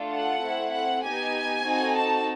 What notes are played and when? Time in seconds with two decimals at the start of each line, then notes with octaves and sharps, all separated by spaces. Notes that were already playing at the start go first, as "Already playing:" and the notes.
Already playing: A3 D4 F4 A4
0.13 F#5
0.42 A3 C4 E4
0.74 F#5
1.04 B3 D#4 G4 G#5
1.65 C4 D#4 F#4 A4
1.97 A5